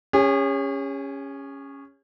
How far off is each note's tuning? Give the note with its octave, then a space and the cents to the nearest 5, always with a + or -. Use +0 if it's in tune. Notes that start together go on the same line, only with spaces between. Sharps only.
C#4 +0 G#4 -45